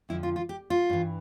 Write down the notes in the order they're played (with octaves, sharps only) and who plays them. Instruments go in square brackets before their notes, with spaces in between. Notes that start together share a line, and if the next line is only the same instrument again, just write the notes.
[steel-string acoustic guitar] F2 D3 F3 E4
F4
F4
G4
F4
G2 E3